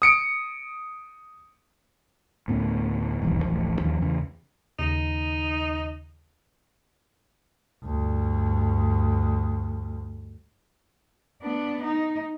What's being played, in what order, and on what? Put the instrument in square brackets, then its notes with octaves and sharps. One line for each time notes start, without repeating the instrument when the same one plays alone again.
[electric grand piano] D#6 C#7 D7
[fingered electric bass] D2 A2 B3 C#4
D#1 B1 E2 G#2
D1 A1 F3
D#2 F3
E2 C#3
[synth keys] D#2 C#3 A#6 [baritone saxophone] D#4
[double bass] D2 G2
[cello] B3 D4
D#4